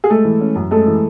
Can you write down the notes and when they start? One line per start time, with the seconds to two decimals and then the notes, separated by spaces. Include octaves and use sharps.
0.04 G#4
0.10 G#3 A3 A4
0.25 E3
0.41 C#4
0.56 F#2
0.71 G#3 A3 A4
0.87 E3